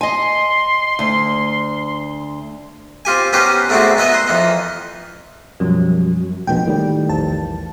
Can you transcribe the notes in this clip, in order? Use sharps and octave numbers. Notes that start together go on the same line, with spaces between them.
D#5 G#5 C6
D2
C4 F4 G4 G#5
B3 C#4 D#4 G4 B4 C5
G#2 A3 B3 C4 D4 F#4
B3 D#4 B4 D#5 E5
C6
F2 E3 D#4
F#2 B2 F3 G3
E1 A#1 B2 G5
A2 D#3 G3
A#1 E2 A5